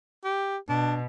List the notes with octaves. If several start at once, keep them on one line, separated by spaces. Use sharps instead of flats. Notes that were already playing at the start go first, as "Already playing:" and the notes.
G4
B2 D4